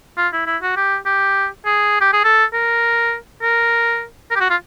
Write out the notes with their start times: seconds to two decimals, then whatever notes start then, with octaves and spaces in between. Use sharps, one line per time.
0.18 F4
0.33 E4
0.47 E4
0.62 F#4
0.77 G4
1.06 G4
1.66 G#4
2.01 G4
2.13 G#4
2.24 A4
2.54 A#4
3.42 A#4
4.31 A#4
4.36 G4
4.41 F#4
4.50 F4